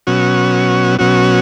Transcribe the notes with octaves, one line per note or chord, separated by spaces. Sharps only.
B2 F#3 C#4 F#4
B2 F#3 C#4 F#4